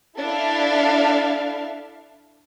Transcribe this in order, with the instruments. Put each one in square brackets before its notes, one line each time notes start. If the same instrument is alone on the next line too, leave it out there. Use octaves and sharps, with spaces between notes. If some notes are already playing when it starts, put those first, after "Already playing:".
[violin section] D4 E4 A4 E5 F5